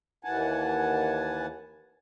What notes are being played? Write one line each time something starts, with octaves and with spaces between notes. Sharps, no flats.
D#2 E3 F#5 G#5 A5